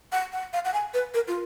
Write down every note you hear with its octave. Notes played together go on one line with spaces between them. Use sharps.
F#5
F#5
F5
F#5
G#5
B4
A#4
F4